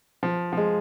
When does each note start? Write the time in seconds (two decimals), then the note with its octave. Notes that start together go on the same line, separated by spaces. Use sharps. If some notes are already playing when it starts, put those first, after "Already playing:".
0.23 F3
0.53 F3
0.57 G#3